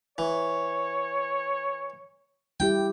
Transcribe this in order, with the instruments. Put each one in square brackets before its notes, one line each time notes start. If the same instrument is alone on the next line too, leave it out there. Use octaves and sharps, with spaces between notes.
[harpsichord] E3 [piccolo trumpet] C#5
[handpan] G3 E4 G4 [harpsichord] G5